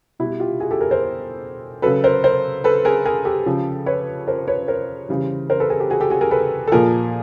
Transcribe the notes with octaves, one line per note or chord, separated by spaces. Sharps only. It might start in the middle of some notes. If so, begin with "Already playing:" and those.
B2 G3 E4 F#4
F4 G4
F#4 G#4
G4 A4
G#4 A#4
A#4 C5
C#3 F#3 A4 B4
A#4 C5
A#4 C5
A4 B4
G#4 A#4
G#4 A#4
G4 A4
C#3 F3
B4 C#5
A#4 C5
B4 C#5
A#4 C5
C#3 E3 G3
A#4 C5
A4 B4
G#4 A#4
G4 A4
F#4 G#4
G4 A4
F#4 G#4
G#4 A#4
A4 B4
A4
A#2 F3 G#4 A#4